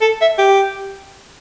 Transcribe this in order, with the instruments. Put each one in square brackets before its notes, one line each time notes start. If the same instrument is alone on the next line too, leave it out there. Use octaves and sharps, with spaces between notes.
[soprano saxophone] A4
E5
G4